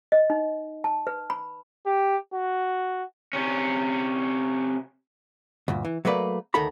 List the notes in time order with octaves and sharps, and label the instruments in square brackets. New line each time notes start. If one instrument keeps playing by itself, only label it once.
[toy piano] D#5
D#4
A5
B4
B5
[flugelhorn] G4
F#4
[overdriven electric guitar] C3 C#4
[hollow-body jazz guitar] D2 G2 A#2
E3
F#3 A3 A#3 B4 D5
D2 D#3 A4 A#4 A#5 B5